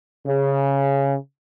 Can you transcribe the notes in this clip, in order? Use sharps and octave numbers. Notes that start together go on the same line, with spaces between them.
C#3